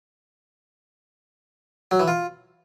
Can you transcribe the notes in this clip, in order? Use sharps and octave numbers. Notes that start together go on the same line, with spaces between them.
F#3
E3
F4